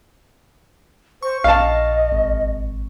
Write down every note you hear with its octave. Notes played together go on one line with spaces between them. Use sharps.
C5 C#6
A#1 D#5 F5 A5
G#1